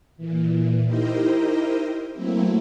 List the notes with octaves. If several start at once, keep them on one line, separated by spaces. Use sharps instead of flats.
A#2 E3
D#4 E4 G4 A#4 C5 D#5
F#3 A3 A#3 C4 E4